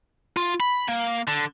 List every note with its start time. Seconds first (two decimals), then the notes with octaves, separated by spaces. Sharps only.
0.37 F4
0.60 B5
0.88 A#3
1.28 D3